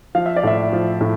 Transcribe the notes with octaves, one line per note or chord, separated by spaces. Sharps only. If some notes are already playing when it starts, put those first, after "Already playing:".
F3 F5
E5
D5
A2 E5
F3
A2